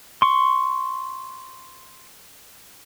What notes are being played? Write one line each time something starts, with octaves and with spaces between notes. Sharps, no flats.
C6 C#6